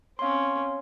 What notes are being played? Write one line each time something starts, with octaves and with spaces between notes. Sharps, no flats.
C4 C#4 F5 C6